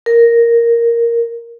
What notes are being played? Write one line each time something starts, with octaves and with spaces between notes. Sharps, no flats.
A#4